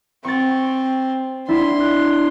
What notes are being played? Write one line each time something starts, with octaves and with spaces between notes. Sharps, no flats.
C4 C#6 A6
D4 E4 C6
F#6